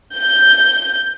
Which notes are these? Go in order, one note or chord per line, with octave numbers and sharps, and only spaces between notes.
G6